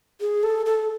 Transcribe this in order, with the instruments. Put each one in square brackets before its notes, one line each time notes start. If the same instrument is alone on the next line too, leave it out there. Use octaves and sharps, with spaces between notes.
[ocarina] G#4
A4
A4